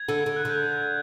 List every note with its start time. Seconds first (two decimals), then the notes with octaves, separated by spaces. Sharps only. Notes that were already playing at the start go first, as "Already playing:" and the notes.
Already playing: G#6
0.08 D3
0.26 D3
0.36 F#6
0.45 D3 G6
0.63 G#6